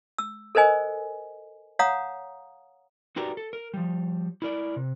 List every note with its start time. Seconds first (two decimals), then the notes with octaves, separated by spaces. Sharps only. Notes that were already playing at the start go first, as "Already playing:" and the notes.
0.18 E6
0.55 A4 A#4 C5 D#5 G#5
1.79 C#5 F5 F#5 A#5 D#6
3.16 D#4 F#4 G4 A#4 B4 D5
3.37 A4
3.53 A#4
3.74 F3 G3
4.42 E4 A#4 D5
4.76 C3